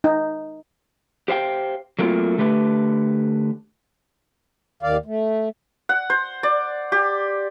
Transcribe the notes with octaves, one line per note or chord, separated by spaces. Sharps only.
D#4
G4 C5 F5 G5
F#3 A3 A#3 C4 F4
D3 A3 G4 B4
D#2 D#3 D5 F5
A3
F#5
C5
D5
G4